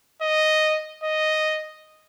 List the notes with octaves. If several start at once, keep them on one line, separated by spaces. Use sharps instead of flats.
D#5
D#5